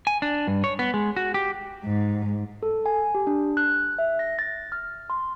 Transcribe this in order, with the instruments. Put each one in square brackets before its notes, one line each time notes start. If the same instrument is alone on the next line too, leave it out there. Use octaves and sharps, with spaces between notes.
[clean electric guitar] G#5
D4
G2
C#5
B3
G#3
F#4
G4
[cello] G#2
[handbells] A4
G#5
G4
D4
F#6
E5
A#6
A6
F6
C6